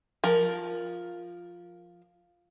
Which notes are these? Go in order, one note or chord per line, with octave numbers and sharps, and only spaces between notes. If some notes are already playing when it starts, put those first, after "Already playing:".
F3 A#4